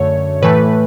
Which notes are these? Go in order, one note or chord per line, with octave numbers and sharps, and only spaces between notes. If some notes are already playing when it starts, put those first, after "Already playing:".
Already playing: F#2 D3 A3 C#5
A2 E3 A3 B4